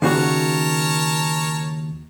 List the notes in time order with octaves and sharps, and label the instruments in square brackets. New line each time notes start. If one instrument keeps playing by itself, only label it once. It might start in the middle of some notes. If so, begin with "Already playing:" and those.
[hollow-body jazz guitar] D#2 C#3 F#4 [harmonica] A#4 C#5 A5